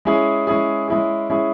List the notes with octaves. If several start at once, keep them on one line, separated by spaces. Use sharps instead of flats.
G#3 C#4 E4 G#4
G#3 C#4 E4 G#4
G#3 C#4 E4 G#4
G#3 C#4 E4 G#4